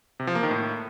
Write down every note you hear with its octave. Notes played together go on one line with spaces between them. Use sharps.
C3
F3
A#3
D#3
A2